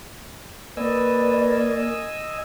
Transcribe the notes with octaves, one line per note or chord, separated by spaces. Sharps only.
A#3 B4 D5 D#5 G#5 E6